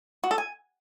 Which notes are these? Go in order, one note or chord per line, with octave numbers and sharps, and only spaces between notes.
F#4
A4
G#5